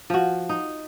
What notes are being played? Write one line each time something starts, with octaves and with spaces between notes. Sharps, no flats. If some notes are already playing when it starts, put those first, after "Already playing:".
F3 F#4
D#4